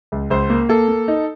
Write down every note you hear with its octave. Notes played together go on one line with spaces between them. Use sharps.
C#2
C#2 C5
A#3
A#3 A4
A#3
D#4